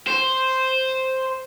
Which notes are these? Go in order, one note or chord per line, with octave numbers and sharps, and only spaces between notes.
C5